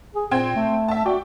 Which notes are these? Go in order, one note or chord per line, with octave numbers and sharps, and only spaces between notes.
G#4
A#2 C4 G5 G#6
A3
E5 A5
F#4 D5 G5